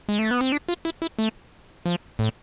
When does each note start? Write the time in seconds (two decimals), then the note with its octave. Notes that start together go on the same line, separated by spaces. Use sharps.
0.09 G#3
0.19 A3
0.31 B3
0.41 C4
0.52 D4
0.69 F4
0.85 E4
1.02 E4
1.19 A3
1.86 F3
2.19 A2